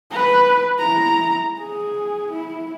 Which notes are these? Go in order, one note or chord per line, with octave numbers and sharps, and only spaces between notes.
B4
E4 A#5
G#4
E4